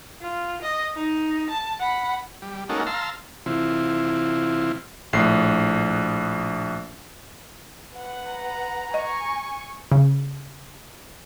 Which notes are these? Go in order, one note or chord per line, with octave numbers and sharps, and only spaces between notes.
F4
D#5
D#4
A5
F#5 B5
G3
G#3 A#3 C#4 D#4 F#4 A4
F5 A5 A#5 C6 E6
C3 E3 C4 E4 F4
A#1 A2 C7
B4 F#5
A#5
D#5 G#5 C#6
C#3